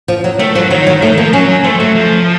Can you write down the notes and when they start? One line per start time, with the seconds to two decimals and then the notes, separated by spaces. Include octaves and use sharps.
0.08 F3
0.24 F#3
0.39 D#3 A3
0.55 F3 F#3
0.71 D#3 F#3
0.87 F#3
1.02 D#3 A3
1.17 F3 A#3
1.33 F#3 C#4
1.64 A3 C4
1.80 F#3 A3
1.95 F3